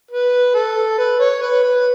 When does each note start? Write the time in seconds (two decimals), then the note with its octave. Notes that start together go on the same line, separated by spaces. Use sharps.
0.11 B4
0.55 A4
0.98 B4
1.20 C#5
1.42 B4
1.63 B4